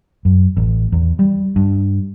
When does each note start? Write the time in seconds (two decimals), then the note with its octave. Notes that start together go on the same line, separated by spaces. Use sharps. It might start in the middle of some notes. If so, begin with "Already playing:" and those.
0.25 F#2
0.57 A1
0.92 E2
1.19 G3
1.56 G2